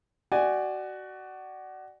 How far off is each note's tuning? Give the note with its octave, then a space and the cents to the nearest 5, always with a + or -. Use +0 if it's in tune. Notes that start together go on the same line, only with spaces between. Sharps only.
F#4 +20 D5 +20 G#5 +0